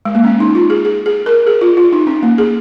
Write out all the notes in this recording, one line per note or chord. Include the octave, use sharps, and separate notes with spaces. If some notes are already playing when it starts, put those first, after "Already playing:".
G#3
A#3
C#4
D#4
F4
G#4
G#4
G#4
A#4
G#4
F4
F4
D#4
C#4
A#3
G#4